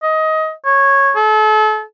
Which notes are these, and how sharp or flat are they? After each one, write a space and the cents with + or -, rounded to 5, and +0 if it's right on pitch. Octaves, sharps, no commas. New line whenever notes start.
D#5 +20
C#5 -10
A4 -35